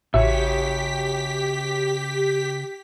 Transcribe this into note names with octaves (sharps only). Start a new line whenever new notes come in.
A1 C#3 F#4 G4 C#5 E5 B6